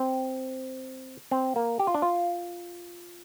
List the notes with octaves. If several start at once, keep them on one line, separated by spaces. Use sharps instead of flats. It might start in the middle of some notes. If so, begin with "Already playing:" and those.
Already playing: C4
C4
A#3
G4
F4
D4
F4